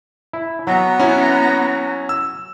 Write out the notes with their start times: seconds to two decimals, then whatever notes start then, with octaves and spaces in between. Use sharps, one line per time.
0.33 E4
0.67 F#3 B3 A#5
1.00 C#4 E4
2.09 E6